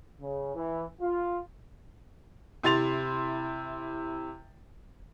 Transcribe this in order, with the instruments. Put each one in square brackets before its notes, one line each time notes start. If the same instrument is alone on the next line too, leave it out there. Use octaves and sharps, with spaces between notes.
[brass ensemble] C#3
E3
F4
[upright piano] C3 E4 C6 A6 F7